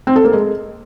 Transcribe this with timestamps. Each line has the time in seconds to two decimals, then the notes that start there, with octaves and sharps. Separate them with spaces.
0.07 C4
0.16 A4
0.25 A#3
0.33 G#3